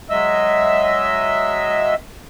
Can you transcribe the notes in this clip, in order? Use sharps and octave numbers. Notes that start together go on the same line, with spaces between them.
F#3 G#3 D#5 E5 E6